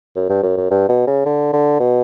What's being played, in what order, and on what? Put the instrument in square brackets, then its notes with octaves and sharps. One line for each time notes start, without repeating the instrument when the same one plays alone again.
[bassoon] F#2
G2
F#2
F#2
G2
B2
C#3
D3
D3
B2